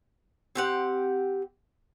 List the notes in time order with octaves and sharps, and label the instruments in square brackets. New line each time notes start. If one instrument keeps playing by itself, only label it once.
[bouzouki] C4 G4 F#5